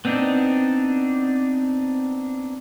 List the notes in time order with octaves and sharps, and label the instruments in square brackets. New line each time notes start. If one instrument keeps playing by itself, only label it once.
[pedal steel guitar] B3 C4 D4 D#4